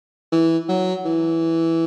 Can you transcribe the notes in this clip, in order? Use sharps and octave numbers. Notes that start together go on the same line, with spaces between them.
E3
F#3
E3